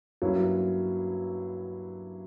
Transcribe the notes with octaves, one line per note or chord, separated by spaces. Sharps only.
G2 F#3 A#3 C#4 E4